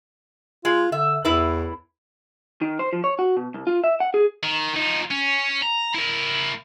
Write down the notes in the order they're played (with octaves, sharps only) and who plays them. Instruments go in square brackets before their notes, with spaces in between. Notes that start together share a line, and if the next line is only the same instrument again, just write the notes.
[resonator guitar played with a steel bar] G#3 [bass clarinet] F4
[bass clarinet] D3 [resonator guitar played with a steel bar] E5
[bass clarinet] E2 [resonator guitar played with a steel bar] A2 E4 B4
[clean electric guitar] D#3
C5
F3
C#5
F#4
B2
C2
F4
E5
F#5
G#4
[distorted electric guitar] D#3
F3 D#4
C#4
A#5
E4 A#4